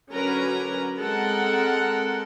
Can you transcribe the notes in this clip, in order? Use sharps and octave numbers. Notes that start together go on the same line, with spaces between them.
D3 F#3 C#4 A#4 B4 A#5
G#3 C4 A4 A#4 F#5